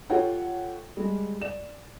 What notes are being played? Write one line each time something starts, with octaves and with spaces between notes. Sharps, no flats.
F4 G4 A4 C#5 F#5 G5
G3 G#3
D5 E7